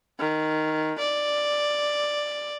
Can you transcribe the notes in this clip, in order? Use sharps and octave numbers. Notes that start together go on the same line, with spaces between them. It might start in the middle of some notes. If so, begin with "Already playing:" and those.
D#3
D5